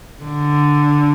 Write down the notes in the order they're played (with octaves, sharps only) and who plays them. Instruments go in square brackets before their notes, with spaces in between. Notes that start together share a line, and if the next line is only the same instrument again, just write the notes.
[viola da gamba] D3